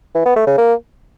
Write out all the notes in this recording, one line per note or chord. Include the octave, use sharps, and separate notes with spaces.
E3
B3
A3
C#3
A#3